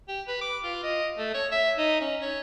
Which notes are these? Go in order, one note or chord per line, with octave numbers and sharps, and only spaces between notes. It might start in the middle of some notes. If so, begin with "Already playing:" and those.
G4
B4
D6
F4
D#5
A3
C#5
E5
D#4
C#4
C#5